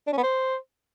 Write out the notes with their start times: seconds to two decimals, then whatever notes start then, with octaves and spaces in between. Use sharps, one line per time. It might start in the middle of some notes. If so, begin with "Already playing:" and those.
0.07 D4
0.12 C#4
0.18 B3
0.23 C5